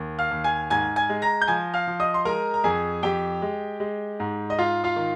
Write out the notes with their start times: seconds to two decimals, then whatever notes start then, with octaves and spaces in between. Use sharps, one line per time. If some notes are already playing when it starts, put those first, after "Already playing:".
Already playing: D#2
0.19 F5 F6
0.31 D#2
0.44 G#5 G#6
0.70 G#2 G#5 G#6
0.96 G#5 G#6
1.09 G#3
1.22 A#5 A#6
1.41 G6
1.48 F3 G#5 G#6
1.74 F5 F6
1.87 F3
2.00 D#5 D#6
2.14 C6
2.25 G#3 A#4 A#5
2.54 A#5
2.64 F2 G#4 G#5
3.03 F2 G4 G5
3.42 G#3
3.80 G#3
4.20 G#2
4.50 D#5
4.58 G#2 F4 F5
4.84 F4 F5
4.96 D#3